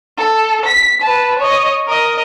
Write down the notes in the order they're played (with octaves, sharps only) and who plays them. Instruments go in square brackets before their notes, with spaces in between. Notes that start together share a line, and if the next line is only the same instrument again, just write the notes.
[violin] A4
B6
B4 A5
C#5 D#5
A#4 D#5